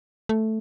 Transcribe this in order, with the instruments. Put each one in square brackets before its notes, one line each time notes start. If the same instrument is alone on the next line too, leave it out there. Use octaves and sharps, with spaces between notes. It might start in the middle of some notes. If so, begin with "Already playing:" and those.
[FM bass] A3